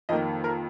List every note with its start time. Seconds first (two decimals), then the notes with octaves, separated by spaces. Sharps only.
0.09 F2 D#3 A#3 D#5
0.44 A#4